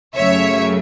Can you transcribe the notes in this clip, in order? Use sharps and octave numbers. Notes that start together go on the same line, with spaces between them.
F#2 C#3 F#3 A3 C#5 E5